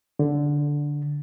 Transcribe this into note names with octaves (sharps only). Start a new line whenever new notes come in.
D3